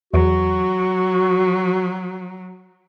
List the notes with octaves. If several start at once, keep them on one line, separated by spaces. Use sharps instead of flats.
E2 F#3 F#4